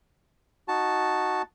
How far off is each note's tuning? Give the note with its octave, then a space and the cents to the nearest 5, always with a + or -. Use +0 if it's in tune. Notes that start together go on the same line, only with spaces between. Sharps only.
D#4 +5 F#4 +0 A5 +0